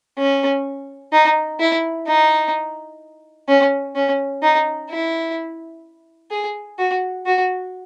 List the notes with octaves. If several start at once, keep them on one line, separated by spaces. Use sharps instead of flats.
C#4
D#4
E4
D#4
C#4
C#4
D#4
E4
G#4
F#4
F#4